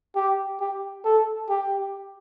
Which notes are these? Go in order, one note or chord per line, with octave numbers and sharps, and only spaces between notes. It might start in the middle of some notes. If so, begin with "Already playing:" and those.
G4
G4
A4
G4